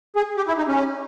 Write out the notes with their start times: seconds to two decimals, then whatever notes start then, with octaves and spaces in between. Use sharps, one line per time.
0.16 G#4
0.37 G4
0.48 E4
0.58 D#4
0.68 C#4